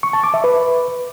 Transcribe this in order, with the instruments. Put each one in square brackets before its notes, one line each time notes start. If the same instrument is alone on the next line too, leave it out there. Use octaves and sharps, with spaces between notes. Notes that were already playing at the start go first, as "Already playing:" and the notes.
[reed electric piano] C#6
A5
D6
E5
B4